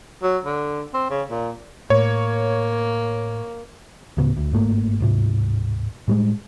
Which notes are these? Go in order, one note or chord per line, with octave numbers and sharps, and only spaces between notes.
F#3
D3
C4
C#3
A#2
A2 A#3 C#5
D2 A2 C#3 B3
D2
G1 G#2 A3 A#3
D1 G#2 C3
A2 G3 G#3